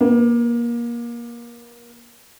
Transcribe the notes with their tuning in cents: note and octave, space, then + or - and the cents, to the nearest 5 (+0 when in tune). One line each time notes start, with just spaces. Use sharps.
A#3 +25 B4 +0